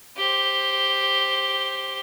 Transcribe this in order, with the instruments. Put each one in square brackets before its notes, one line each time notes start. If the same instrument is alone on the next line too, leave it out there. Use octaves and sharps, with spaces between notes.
[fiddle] G4 C5